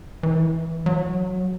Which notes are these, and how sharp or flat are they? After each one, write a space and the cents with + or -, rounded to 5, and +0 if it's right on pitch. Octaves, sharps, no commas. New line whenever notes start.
E3 -10
F#3 -10